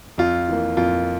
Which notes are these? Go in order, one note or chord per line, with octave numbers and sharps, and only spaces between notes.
F2 F4
E3 A#3
F2 F4